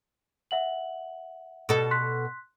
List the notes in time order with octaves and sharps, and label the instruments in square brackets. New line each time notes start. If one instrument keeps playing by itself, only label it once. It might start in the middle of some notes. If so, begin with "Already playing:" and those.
[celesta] E5 F#5 F#7
[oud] B2 A4
[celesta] C6 F#6 B6